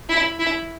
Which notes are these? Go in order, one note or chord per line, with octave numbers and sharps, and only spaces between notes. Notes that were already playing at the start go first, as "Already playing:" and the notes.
E4
E4